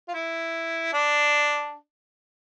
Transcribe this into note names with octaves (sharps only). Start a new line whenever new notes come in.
F4
E4
D4